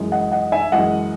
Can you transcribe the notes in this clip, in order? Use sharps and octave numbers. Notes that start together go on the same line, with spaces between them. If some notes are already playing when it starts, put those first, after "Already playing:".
Already playing: F#2 E3 G#3
D#5 F#5
D#5 F#5
E5 G#5
F#2 E3 G#3 D#5 F#5